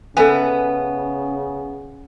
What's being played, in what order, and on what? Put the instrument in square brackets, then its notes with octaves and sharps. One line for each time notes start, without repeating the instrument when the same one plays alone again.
[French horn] C#3 [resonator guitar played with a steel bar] B3 [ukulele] A4 E5 G#5